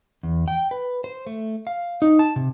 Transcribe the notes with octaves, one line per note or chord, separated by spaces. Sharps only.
E2
G5
B4
C5
A3
F5
D#4
A5
C3